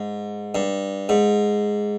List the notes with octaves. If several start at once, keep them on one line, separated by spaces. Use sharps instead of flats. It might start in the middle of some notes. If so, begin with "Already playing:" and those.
Already playing: G#2
G2
G#2